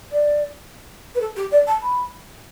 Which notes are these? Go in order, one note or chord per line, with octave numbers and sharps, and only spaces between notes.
D5
B4
A4
G4
D5
A5
B5